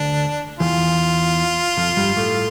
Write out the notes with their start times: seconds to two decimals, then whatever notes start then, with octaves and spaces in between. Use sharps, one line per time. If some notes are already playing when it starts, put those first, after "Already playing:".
Already playing: D2 D4
0.60 E2 E3 F4
1.77 F2 F3
1.97 G2 G3
2.16 A2 A3